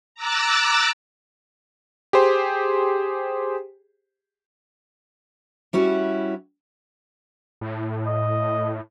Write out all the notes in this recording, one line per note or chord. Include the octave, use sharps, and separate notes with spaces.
A#5 D6 E6 F#6 A6
G4 G#4 C5
G3 C#4 E4 F#4
A2
D#5